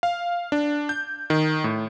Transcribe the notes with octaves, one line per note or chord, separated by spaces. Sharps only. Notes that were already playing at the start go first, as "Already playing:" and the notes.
F5
D4
G6
D#3
A2